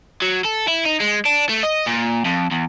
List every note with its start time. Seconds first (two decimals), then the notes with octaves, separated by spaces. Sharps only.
0.22 F#3
0.45 A4
0.68 E4
0.86 D#4
1.01 G#3
1.26 D4
1.49 A3
1.63 D#5
1.87 A#2
2.25 F2
2.51 E2